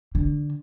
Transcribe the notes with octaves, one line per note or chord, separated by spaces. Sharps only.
D3